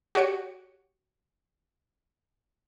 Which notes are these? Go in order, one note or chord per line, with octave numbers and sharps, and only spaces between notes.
F#4 G4 C#5 C#7